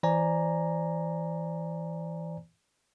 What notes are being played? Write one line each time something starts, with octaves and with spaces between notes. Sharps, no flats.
E3 C5 D5 G#5 A#5